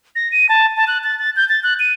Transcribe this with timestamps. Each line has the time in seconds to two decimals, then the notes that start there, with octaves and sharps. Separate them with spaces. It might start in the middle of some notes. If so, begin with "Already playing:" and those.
0.16 A#6
0.32 D#7
0.49 A5
0.76 A5
0.88 F#6
1.04 A6
1.19 A6
1.36 G6
1.49 A6
1.63 F#6
1.80 D#7